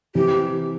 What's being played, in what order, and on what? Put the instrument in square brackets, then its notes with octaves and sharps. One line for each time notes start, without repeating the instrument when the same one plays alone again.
[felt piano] C3 E3 [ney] G4